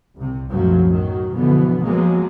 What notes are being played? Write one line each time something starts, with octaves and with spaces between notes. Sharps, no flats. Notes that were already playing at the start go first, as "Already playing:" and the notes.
C2 C3
B1 F#2 A2 F3 F#3
B1 D#3 F#3
B2 D3 E3 F3 B3
F3 F#3 G#3 A#3 B3